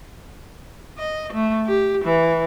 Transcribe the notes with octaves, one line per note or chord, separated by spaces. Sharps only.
D#5
A3
G4
E3